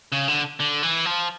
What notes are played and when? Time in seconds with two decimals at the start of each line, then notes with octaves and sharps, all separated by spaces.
0.12 C#3
0.28 D3
0.60 D3
0.83 E3
1.05 F3